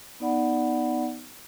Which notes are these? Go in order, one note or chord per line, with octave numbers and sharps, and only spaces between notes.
B3 D#4 D5 F#5 B5